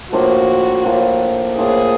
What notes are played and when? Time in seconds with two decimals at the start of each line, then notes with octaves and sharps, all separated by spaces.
0.12 A2 F3 A#3 D4 F#4
0.85 A2 F3 A#3 D4
1.58 A2 F3 A#3 D4 G#4